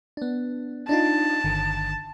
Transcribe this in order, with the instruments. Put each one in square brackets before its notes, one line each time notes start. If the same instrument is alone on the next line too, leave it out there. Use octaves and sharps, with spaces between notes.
[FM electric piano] B3 D4
[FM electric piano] D4 D#4 F4 [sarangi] A5
[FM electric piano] G1 D3 D#3